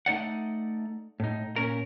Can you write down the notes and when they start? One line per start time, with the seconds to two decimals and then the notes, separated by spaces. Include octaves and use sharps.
0.06 A3 D#4 D5 F#5
1.20 A2 D#4
1.56 A#2 C#4 A#4